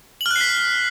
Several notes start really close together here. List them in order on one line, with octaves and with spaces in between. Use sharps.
F#7 F6 F#6 C7 B6